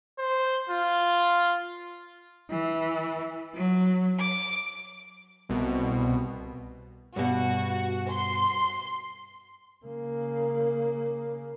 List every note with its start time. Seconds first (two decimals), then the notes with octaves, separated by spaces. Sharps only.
0.18 C5
0.69 F4
2.48 E3
3.53 F#3
4.19 D6
5.49 C2 B2
7.16 G2 B2 F#4
8.10 C6
9.85 C#3 A#3